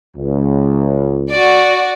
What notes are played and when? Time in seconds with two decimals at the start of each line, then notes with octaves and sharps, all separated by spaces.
0.17 C#2
1.30 F#4 D5